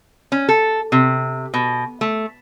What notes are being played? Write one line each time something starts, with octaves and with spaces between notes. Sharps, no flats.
C#4
A4
C3
B2
A3